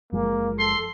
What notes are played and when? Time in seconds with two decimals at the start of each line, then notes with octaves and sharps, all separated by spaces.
0.12 F#1 F3 G#3 A#3
0.59 A4 C6